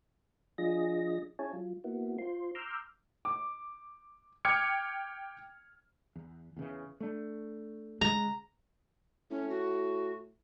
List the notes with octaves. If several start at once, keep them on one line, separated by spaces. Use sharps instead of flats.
F3 D4 F4 G#4 D#5 A#6
C#4 E4 G#4 C#5 G#5 A5
F#3 F4
A#3 B3 E4 F#4
F4 C5 C6
A#5 C6 D6 E6 F6 G6
D6
G5 D6 F6 G#6 C#7
E2
E2 C#3 E3
A3 D4
C#3 G#3 A#5
A2 C#4
F#4